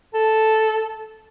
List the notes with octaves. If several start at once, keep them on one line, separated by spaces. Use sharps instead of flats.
A4